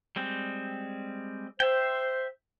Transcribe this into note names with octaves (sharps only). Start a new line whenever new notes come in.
G3 G#3 C4
C5 E5 G5